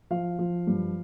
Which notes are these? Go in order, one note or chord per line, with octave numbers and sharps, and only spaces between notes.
F3 F5
F3
G2